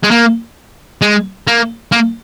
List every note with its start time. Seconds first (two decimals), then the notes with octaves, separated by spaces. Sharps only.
0.04 G#3
0.11 A#3
1.02 G#3
1.47 A#3
1.92 A#3